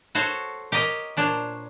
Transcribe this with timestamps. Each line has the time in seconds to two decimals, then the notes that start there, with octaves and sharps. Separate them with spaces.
0.15 F#4 A4 C5 C#5
0.72 G4 A#4 C#5 D#5
1.17 A#2 D4 C5 C#5